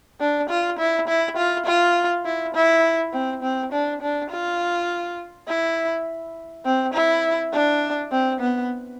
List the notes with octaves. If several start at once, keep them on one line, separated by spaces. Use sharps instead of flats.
D4
F4
E4
E4
F4
F4
E4
E4
C4
C4
D4
D4
F4
E4
C4
E4
D4
C4
B3